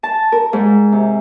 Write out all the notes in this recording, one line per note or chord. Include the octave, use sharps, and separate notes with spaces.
A5
A#4
G#2
C3